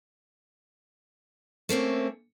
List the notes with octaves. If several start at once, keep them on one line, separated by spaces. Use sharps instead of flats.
A3 A#3 C4 C#4